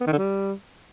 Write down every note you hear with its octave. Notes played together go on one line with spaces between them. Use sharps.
B3
D#3
D3
G3